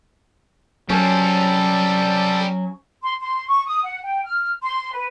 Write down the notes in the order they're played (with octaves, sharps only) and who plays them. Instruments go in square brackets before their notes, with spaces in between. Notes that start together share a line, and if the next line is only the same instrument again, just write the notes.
[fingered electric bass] F#3 [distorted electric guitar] G3 C4 [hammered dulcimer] C#4 [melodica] A4
[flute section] C6
C6
C#6
D#6
F#5
G5
F6
C6
B4